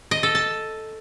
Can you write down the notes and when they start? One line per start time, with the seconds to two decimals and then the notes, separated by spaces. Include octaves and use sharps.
0.11 D#5
0.23 A4
0.35 A5